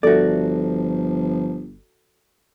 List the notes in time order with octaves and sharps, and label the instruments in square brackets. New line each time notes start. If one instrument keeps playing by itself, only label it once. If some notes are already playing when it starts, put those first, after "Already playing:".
[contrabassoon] G1 [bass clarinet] F3 [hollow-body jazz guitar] F#4 D5 [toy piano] A4 E5